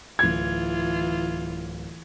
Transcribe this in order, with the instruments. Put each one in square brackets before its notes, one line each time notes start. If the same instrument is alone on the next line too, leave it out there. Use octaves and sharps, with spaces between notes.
[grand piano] D1 G#6 [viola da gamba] E3 F4